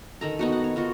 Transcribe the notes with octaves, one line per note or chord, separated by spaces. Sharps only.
D#3 A4 A#5
B3 D#4 F#4
F#5
C#5
D#4 F4 F#4